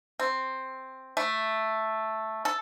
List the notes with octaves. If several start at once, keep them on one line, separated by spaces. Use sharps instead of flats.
C4
A3
A4